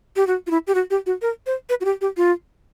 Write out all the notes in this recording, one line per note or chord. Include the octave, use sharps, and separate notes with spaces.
G4
F#4
F4
E4
G4
F#4
G4
F#4
A#4
C5
B4
F#4
G4
G4
F4